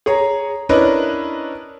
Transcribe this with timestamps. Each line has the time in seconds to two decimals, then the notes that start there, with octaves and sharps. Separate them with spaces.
0.06 G#4 C#5 A#5
0.69 C#4 D4 E4 A#4 B4 D#5